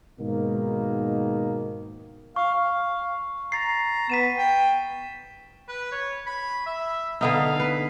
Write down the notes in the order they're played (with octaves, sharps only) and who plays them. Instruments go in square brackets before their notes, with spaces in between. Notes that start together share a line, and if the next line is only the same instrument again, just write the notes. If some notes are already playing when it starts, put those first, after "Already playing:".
[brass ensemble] G#2 B2 D#3 A#3
[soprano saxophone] F5 [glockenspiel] C#6
[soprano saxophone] F5
[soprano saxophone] A#5 [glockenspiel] A6 C7
[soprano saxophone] B3 [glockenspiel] B6 D#7 E7
[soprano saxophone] G5
[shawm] B4
C#5
B5
E5
[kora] D3 B3 D#4 [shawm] F5
[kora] B4